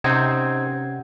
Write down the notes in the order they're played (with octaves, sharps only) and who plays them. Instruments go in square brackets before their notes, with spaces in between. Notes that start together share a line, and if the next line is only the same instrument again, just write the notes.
[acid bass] C3 [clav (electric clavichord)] C4 D#4 [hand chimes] C#4 F#5 G#6